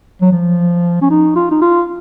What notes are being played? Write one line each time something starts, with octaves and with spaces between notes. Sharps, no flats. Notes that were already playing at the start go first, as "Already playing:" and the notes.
F#3
F3
C#4
D#4
F4
D#4
F4